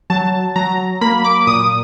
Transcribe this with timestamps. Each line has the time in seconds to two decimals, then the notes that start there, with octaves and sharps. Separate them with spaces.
0.10 F#3 A5
0.56 F#3 A#5
1.01 A#3 B5
1.24 D6
1.47 A#2 D#6